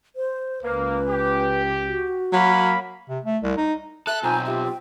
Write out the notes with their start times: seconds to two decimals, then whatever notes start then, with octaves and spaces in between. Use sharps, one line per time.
0.16 C5
0.63 C#2 A#3 B4
1.07 G4
1.88 F#4
2.33 F#3 A#3 B5
3.09 C3
3.25 A3
3.43 C2
3.57 D#4
4.07 A4 E5 F#6
4.23 B1 C4 F4 G#5 A#5 G6
4.46 F4 G4 E5
4.65 G5